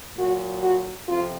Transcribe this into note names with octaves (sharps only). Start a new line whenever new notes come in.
A#2 F#3 F#4
F#4
F2 C3 F4